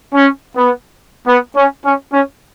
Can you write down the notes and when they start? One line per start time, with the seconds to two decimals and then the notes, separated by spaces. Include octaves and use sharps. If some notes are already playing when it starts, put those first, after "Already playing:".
0.13 C#4
0.56 B3
1.27 B3
1.55 C#4
1.84 C#4
2.12 C#4